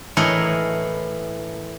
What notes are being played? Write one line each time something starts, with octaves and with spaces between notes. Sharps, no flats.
A2 E3 A3 A#4 C#5 D#5